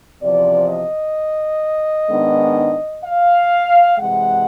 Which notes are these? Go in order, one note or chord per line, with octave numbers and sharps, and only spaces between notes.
E2 C3 F3 D5
D#5
G#2 D#3 G#3 B3 D4
F5
C3 E3 G#3 F#5